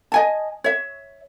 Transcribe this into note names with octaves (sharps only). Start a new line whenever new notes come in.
D#5 G#5 A5
C#5 E5